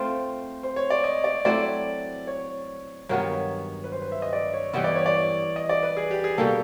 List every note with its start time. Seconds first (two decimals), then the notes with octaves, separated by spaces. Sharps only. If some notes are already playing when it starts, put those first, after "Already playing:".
Already playing: A3 C4 F4 C5
0.63 C5
0.76 C#5
0.90 D5
1.04 D#5
1.24 D5
1.45 F#3 A3 C4 E4 D5
2.27 C#5
3.09 G2 D#3 F#3 B3 C#5
3.84 B4
3.92 C5
4.02 B4
4.12 E5
4.22 D#5
4.33 D5
4.53 C#5
4.73 E3 G3 B3 E4 D#5
4.84 D5
4.95 C#5
5.06 D5
5.56 D#5
5.69 D5
5.83 B4
5.97 G#4
6.11 G4
6.24 G#4
6.38 B2 G3 A#3 D#4 A4